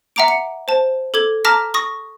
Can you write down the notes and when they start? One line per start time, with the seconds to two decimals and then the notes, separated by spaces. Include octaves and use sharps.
0.16 E5 F#5 A#5 D6 D7
0.28 C#7
0.68 C5 A5
1.14 A4 D6 G#6 G7
1.45 A5 A#5 D6 F6 A#6 B6
1.74 C#6 D#6 A#6